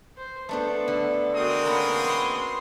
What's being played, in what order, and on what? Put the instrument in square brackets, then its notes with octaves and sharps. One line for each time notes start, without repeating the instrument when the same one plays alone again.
[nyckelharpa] C5
[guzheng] A3 D4 C5 [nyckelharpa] B3 A4
[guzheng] D3
[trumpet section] G#3 C4 D#6 [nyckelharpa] F#4 A#4
[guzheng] A#3 B3 C#4
[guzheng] B3 [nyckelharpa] C6